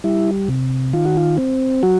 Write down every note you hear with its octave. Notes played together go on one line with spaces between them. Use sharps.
G3 E4
C3
D#3 F4
F#4
F4
C4
F#3 F#4